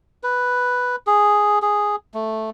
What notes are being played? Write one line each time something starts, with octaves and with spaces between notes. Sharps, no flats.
B4
G#4
G#4
A3